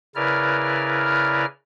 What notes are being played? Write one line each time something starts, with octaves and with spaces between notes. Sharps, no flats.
C#3 E4 A#4 B4 D5 F6